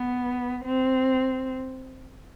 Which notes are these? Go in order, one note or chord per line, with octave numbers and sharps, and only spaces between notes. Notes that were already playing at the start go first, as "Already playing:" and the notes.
Already playing: B3
C4